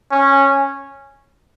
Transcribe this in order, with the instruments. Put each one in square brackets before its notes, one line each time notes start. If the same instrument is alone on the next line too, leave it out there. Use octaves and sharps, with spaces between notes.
[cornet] C#4